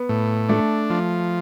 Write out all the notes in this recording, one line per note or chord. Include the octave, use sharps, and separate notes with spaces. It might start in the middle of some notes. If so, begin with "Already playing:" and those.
Already playing: B3
A2
A3 D4
F3